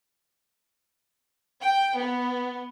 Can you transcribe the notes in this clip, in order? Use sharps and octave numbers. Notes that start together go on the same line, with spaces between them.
G5
B3